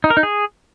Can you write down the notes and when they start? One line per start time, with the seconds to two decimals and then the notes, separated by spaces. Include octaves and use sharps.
0.04 D#4
0.10 A#4
0.17 D#4
0.23 G#4